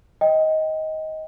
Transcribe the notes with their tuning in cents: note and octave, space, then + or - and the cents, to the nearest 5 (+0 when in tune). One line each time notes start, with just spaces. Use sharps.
D#5 +15 G5 +0